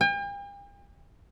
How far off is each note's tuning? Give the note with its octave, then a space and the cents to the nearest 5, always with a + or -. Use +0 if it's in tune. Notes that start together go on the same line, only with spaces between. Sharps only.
G5 +45